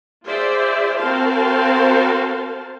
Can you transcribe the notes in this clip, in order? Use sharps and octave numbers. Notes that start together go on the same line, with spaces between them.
F4 G#4 C5 D5 E5
C4 F#4 A#4 C5 F5 A5